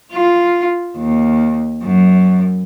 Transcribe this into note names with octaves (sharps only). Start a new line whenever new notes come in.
F4
D#2
F#2